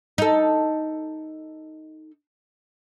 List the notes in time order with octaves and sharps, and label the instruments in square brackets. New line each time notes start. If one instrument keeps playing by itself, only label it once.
[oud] D#4 A4